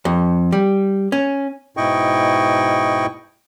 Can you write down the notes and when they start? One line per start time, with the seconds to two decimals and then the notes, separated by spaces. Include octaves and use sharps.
0.05 F2
0.52 G3
1.12 C#4
1.77 G#2 B2 E4 D#5 G5 C#6